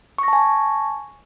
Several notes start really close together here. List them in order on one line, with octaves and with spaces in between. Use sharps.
C#6 A#6 A5 G#5